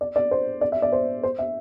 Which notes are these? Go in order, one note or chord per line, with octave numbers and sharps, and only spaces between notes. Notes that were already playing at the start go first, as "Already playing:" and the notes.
D5
D5
C5
D5
E5
D5
C5
C5
E5